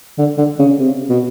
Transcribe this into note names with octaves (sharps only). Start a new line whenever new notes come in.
D3
D3
C#3
C3
B2